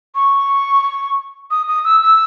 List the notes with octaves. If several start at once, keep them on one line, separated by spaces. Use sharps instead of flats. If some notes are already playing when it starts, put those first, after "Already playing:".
C#6
D#6
D#6
E6
E6